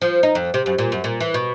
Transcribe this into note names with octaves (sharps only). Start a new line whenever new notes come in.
F3
D#4
F2
C3
F#2
A#2
F#2
A#2
E3
B2